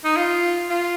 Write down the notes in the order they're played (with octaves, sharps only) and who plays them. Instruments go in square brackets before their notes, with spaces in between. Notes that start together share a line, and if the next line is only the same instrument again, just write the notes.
[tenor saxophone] D#4
F4
F4